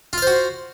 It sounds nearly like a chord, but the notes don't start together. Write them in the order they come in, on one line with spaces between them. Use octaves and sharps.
F4 F5 C5 F#4